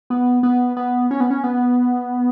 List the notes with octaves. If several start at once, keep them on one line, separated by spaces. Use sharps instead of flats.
B3
B3
B3
C#4
B3
C#4
B3